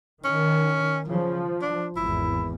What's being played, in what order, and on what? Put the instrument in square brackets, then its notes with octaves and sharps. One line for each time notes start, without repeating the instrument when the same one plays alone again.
[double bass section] D#3 [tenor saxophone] C#4
[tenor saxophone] C#3 [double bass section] F3
[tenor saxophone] D4
[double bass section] G#1 E2 [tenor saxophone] E4